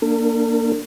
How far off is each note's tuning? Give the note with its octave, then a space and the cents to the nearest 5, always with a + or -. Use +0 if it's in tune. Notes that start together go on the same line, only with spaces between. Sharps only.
A#3 +0 D4 +0 A#4 -40